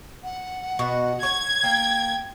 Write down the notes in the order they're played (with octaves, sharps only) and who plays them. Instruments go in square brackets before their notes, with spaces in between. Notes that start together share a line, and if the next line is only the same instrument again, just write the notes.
[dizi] F#5
[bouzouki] B2 F#4
[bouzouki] C#5 [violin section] G#6
[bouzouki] A#3 [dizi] G5